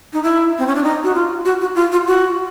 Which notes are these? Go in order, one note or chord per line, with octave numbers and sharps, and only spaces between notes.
D#4
E4
C4
C#4
D4
D#4
F#4
F4
F#4
F#4
F4
F4
F#4